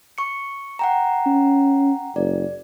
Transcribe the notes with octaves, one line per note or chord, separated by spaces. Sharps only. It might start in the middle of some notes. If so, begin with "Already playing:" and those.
C#6 C#7
F#5 G5 A#5
C#4
F#1 D5